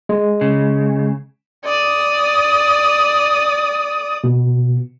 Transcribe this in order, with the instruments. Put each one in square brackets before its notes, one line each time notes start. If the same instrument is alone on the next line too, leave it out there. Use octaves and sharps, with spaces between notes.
[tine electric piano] G#3
[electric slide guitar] C#3
[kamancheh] D5 D#6
[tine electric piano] B2